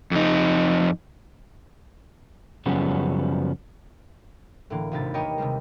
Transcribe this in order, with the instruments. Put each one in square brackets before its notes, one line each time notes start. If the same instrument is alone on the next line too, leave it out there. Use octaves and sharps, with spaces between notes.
[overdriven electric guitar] F2 D#4
[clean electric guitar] F#2 C#3 F3 G3 B3 C#4
[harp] A2 D3 E3 A#3
G#1 D#2 C3 B5 A6
G4 A#4 B4 C#5 D#5 G5
C3 D#3 G3 G#3